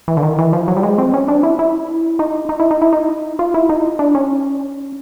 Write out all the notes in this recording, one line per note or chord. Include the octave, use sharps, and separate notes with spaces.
E3
D3
D#3
E3
F3
F#3
G3
G#3
C4
C#4
D4
E4
E4
D#4
D#4
E4
D#4
E4
D#4
F4
E4
D#4
D4
C#4